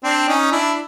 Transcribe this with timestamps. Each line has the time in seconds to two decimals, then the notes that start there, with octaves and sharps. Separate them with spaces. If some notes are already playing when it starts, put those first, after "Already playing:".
0.04 C4 D4
0.28 C#4 D#4
0.52 D4 E4